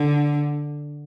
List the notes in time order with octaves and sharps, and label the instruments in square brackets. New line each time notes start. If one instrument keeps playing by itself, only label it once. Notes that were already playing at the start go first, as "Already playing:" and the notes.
Already playing: [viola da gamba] D3